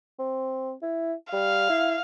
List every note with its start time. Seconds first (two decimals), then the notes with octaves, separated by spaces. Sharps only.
0.19 C4
0.82 E4
1.33 G3 F5
1.70 E4